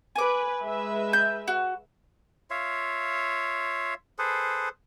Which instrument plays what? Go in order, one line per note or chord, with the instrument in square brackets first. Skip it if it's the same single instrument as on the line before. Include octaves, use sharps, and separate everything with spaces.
[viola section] B4 [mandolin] G#5 D6
[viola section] G#3 B4 E5
[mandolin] G6
F#4
[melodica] F4 C#5 E5 F5
G#4 A4 B4 C5